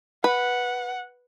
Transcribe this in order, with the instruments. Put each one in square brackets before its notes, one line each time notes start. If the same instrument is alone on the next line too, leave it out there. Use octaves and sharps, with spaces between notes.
[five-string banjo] B4 [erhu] F#5